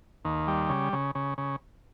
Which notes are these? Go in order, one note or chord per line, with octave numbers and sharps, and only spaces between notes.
D#2
G3
C#3
C#3
C#3
C#3